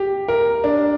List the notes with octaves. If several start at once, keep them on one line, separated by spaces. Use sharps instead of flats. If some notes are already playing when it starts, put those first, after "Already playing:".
Already playing: G4
A#4
D4